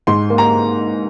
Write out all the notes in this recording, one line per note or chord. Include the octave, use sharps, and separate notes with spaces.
G#2 C6
A#3
A#5